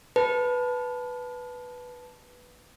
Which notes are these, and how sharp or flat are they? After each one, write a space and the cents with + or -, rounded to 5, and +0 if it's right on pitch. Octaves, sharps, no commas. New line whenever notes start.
B4 +0 A5 -5